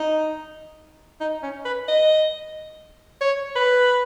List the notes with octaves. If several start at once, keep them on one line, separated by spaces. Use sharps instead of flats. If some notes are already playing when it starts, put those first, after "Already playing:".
Already playing: D#4
D#4
C#4
B4
D#5
C#5
B4